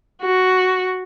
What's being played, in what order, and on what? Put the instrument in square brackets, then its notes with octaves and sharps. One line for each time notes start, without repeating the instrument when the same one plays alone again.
[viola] F#4